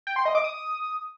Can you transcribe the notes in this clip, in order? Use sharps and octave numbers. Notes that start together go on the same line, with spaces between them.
G5
C6
D#5
D6
D#6